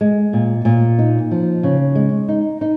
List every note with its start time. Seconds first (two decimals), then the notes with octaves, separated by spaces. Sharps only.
0.01 G#3
0.33 A#2
0.65 A#2
0.99 D#4
1.31 F3
1.63 C#3
1.95 G#3
2.28 D#4
2.61 D#4